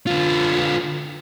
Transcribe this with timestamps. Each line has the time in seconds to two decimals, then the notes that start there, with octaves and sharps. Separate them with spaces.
0.07 D3 F4